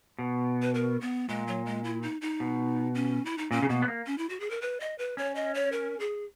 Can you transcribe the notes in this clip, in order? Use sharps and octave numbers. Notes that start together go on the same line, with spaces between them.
B2
B4
A#4
B3
A#2 G#3
F#3
G#3
E4
D#4
D#4
B2
C#4
E4
D#4
A#2 C#4
C#3
B2 A#3
B3
A#3
C#4
E4
F#4
G#4
A#4
B4
D#5
B4
C#4 C#5
D#5
C#5
A#4
G#4